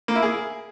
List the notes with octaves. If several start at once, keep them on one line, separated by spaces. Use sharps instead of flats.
A#3
E4
G#4